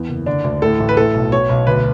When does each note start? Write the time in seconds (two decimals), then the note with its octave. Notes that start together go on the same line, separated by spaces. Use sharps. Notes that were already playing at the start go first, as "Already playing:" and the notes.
Already playing: E2
0.09 F#1
0.26 D3 D4
0.44 D2
0.62 A2 A4
0.80 A1
0.89 B4
0.97 A2 A4
1.15 B1
1.32 B2 C#5
1.49 B1
1.67 D2 B4